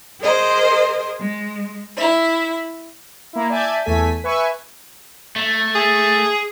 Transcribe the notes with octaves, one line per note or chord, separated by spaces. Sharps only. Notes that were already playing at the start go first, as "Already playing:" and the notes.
G#4 A#4 C5 D#5
G#3
E4 E5
A#3 E4
D5 E5 G#5 A5 G6 G#6
E2 A3 A4 G#5 B6
B4 E5 G#5 C#6
A3
G#4